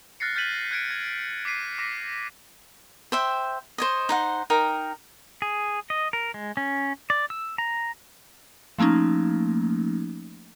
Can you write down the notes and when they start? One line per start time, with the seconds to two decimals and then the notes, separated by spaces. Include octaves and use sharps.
0.20 F6 F#6 A6 A#6 C7 C#7
0.35 F6 G6 A6 B6 D#7 F#7
0.71 F#6 G#6 C#7 D7
0.91 G#6
1.45 D6 B6 C7 D#7
1.78 D6 A#6 B6 D#7
3.12 C5 E5 G5
3.78 C5 C#5 D#5
4.09 D#4 C5 F#5
4.50 D#4 A#4 G5
5.42 G#4
5.90 D#5
6.13 A#4
6.34 G#3
6.57 C#4
7.10 D5
7.30 E6
7.58 A#5
8.78 F3 A3 A#3 C#4 D#4